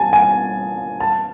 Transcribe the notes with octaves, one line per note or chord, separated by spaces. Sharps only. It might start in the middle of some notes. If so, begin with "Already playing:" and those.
Already playing: G#5 A5
G#5
A5